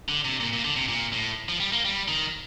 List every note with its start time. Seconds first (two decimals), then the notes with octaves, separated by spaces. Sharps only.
0.09 D3
0.25 C3
0.40 A#2
0.53 A#2
0.64 D3
0.76 C3
0.89 A#2
1.13 A2
1.49 F3
1.60 G3
1.72 A#3
1.85 G3
2.08 D#3